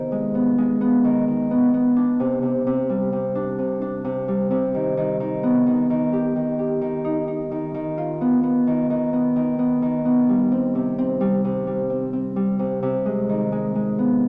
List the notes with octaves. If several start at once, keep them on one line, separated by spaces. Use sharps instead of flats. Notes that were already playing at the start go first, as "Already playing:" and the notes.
Already playing: C3 D#3 B3
G#3
B3
G#3
B3
D#3
D#3
B3
B3
D4
C3
C3
C3
G3
C3
D4
C3
D4
C3
G3
C3
D#3
D#3
D#3
B3
D#3
D#3
G4
D#3
G4
D#3
D#4
D#4
D#3
D#3
F4
B3
B3
D#3
D#3
B3
D#3
B3
D#3
B3
G3
C4
C3
C4
G3
C3
G3
C4
C4
G3
C3
C3
G#3
D#3
G#3
G#3
B3